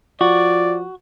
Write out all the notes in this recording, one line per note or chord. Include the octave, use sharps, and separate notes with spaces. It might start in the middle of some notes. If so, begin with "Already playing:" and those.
F3 F#4 D5